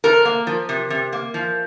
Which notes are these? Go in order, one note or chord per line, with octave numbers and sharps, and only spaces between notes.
C3 A#4
A#3
F3
C3
C3
A#3
F3